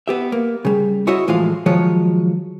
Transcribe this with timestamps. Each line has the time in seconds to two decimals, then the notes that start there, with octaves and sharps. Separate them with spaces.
0.08 B3 G4 E5
0.32 A#3
0.65 C#3 G3
1.07 E4 F#4 C#5 D#5 E5
1.28 A2 E3 F3 G#3 F4 F5
1.66 D#3 F3 F#3 G#3 C#5